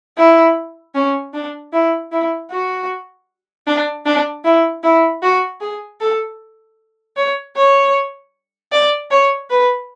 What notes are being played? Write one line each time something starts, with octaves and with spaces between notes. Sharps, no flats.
E4
C#4
D4
E4
E4
F#4
D4
D4
E4
E4
F#4
G#4
A4
C#5
C#5
D5
C#5
B4